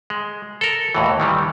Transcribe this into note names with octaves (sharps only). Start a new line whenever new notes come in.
G#3
A4 A#4
D#2 A2 E3
D#3 E3 G3